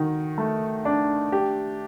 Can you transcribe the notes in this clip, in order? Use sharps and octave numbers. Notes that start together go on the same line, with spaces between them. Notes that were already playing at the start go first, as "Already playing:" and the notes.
Already playing: D#3 F#4
A3
D4
G4